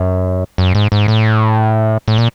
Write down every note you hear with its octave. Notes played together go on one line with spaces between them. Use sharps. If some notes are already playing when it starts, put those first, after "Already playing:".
Already playing: F#2
F#2
G#2
G#2
A2
A2
A#2